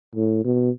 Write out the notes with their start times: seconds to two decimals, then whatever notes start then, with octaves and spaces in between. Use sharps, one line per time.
0.15 A2
0.44 B2